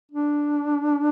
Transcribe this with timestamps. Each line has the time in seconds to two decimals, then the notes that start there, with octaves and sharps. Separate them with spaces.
0.12 D4